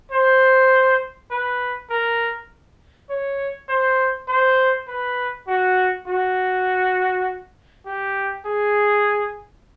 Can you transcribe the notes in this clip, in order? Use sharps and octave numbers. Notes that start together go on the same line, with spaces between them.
C5
B4
A#4
C#5
C5
C5
B4
F#4
F#4
G4
G#4